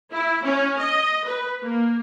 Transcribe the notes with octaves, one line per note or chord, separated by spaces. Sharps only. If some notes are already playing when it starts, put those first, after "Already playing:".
E4
C#4
D#5
B4
A#3